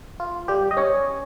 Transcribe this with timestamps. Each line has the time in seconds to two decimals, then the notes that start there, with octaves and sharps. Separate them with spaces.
0.20 F4
0.48 G3 G4
0.71 D#5
0.77 C#4 C#5